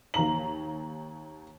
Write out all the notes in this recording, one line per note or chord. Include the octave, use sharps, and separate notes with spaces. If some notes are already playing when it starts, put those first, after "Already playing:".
D#2 A#5 F#7